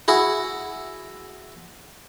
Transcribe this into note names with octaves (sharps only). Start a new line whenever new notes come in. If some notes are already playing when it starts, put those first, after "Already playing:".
E4 F#4 G#4